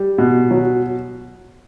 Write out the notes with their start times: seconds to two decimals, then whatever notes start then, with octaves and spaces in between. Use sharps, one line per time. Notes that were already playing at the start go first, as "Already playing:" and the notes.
Already playing: G3
0.18 B2
0.51 F#3